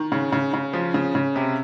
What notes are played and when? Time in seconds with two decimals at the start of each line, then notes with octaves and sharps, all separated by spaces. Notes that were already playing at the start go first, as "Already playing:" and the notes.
Already playing: D#3
0.12 C#3
0.32 C#3
0.53 C#3
0.73 F3
0.94 C#3
1.15 C#3
1.36 C3